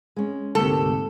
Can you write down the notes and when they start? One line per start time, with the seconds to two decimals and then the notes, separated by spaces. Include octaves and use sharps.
0.16 G#3 C#4
0.55 D2 G#2 C3 A3 A#3 G4 A4